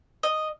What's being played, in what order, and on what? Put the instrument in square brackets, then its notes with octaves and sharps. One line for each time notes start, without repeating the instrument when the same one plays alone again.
[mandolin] D#5